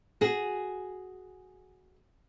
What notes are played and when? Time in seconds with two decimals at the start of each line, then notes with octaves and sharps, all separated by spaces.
0.21 F#4 G#4